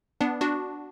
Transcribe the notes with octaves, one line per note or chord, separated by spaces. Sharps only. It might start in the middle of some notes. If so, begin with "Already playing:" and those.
B3 D4
D4 F#4